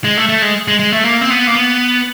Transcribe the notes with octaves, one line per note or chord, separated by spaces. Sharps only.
G#3
A3
A3
G#3
G#3
G#3
A3
A#3
C4
B3
A#3
B3